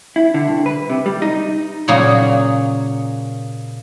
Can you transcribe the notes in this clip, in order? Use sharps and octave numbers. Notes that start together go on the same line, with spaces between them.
E4
D3
C2
B4
C3
G3
D#4
A#2 C#3 F#3 A#3 G#4